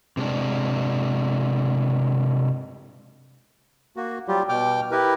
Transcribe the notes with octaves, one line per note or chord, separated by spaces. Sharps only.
C3 G#3 D4
A#3 F#4
F#3 G3 F4 G4
B2 G5 D6 F6
E4 G4 A#4 B4